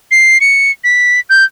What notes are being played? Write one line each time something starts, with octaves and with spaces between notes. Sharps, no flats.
C7
C#7
B6
G6